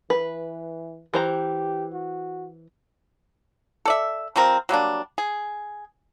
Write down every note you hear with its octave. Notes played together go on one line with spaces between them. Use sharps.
E3 B4
E3 G4 C5 A#5
F#4
A4 D5 E5
F3 G3 C4 A#4
F#3 G3 A#3 D4
G#4